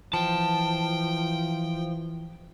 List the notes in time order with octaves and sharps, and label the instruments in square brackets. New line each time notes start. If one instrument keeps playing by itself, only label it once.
[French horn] E3 [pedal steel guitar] F3 [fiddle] G5 [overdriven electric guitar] A5